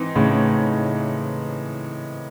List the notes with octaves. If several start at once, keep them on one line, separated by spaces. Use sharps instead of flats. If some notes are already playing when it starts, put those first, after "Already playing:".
Already playing: G#2 E3 C4 D#4
A2 C#3